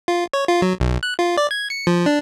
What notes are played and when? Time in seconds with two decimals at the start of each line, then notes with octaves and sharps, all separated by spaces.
0.08 F4
0.33 C#5
0.48 F4
0.62 F#3
0.80 B1
1.03 F#6
1.19 F4
1.37 D5
1.51 G#6
1.70 C#7
1.87 F3
2.06 D4